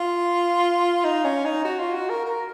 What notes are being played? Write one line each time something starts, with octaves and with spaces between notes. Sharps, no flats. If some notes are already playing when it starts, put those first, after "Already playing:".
Already playing: F4
D#4
C#4
D#4
F#4
F4
F#4
A#4
A#4